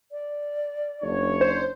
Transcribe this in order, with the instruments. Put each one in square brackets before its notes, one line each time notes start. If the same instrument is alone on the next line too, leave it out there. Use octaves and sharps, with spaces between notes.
[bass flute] D5
[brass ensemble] F#1 D4 C#5
[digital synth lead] C5